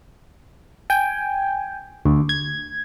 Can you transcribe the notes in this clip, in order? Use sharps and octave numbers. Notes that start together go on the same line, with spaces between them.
G5 G#5
D2
G#6